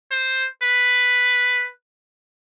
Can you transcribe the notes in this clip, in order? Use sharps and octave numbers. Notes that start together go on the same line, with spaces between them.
C5
B4